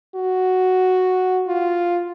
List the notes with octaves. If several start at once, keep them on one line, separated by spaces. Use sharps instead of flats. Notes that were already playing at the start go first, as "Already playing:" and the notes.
F#4
F4